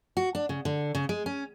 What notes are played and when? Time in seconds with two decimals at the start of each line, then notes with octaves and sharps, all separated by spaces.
0.17 F#4
0.35 D4
0.49 C#3
0.65 D3
0.95 C#3
1.09 G#3
1.26 C#4